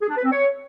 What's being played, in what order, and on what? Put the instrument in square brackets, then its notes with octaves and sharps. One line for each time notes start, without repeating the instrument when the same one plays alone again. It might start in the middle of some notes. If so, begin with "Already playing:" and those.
[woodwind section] G#4
D4
B4
C4
C#5